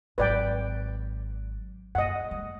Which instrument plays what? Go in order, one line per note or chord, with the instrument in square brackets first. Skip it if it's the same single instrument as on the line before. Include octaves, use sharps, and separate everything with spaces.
[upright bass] G#1 F#3 [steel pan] B4 D5 G5
[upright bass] A#1 F#2 [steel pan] D#5 F#5
[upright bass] G#3